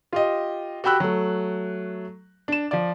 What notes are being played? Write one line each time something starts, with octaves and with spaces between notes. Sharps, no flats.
F4 G4 D#5
F#4 G4 G5 B5 E6 F#6
F#3 A3
D4 E7
F3 D5